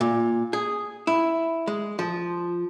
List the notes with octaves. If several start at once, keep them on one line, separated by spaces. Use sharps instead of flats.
A#2
G#4
E4
G#3
F3